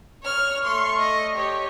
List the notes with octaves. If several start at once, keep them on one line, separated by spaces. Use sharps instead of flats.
C#5 F6
A3 C6 C#6
D#5
G4 C#5